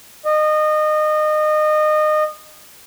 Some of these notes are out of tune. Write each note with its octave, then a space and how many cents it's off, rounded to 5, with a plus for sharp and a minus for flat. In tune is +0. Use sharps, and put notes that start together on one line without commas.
D#5 -25